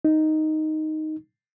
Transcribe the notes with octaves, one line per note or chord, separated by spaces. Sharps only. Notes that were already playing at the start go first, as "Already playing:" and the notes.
D#4